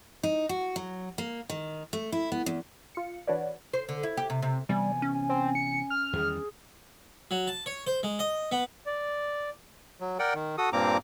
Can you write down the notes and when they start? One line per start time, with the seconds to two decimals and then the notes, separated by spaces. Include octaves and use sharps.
0.23 D#4
0.49 F#4
0.76 F#3
1.18 A#3
1.50 D#3
1.93 A3
2.12 E4
2.32 B3
2.46 E2
2.95 F4 C#7
3.27 E3 D4 F#4 B4 C#5 D5
3.73 C5
3.89 D3
4.03 E4
4.17 G4
4.30 C3
4.42 C3
4.69 C3 E3 G3 B3 G#5
5.02 C#4
5.29 C4
5.55 C#7
5.90 F6
6.13 E2 D#3 G3 G#4
7.31 F#3
7.47 A5
7.66 C#5
7.87 C5
8.03 G#3
8.19 D#5
8.51 B3
8.86 D5
10.00 F#3
10.19 A#4 D5 F#5 G5
10.35 D#3
10.58 F#4 A4 D#6
10.73 G2 A#2 A#3 C4 A#5 D6